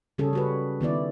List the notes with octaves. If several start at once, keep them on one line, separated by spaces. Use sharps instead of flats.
C#3 G3 C#4 G#4 A4
G3 F#4 B4
D#3 B3 E4 D5